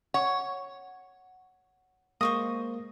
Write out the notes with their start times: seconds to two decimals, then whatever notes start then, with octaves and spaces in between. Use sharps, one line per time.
0.14 C#5 F#5
2.21 G#3 A#3 C5 C#6 D#6 A#6